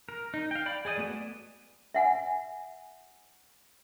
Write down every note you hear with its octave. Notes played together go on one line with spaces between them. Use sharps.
A#4
D#4
F5 G5
D5 G5 B5
G#4 D5 D#5 G#5
A3 B3 F#4 D5 D#5
E5 F#5 G#5